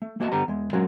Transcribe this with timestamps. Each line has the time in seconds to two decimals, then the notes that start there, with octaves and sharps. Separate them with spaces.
0.02 A3
0.20 A3 A#3 F#4 D#5 F5 A5
0.32 G2 D3 B3 G4 A#5
0.48 E2 G#3
0.73 F#3 G#3 C#4 F4 F#4 A#4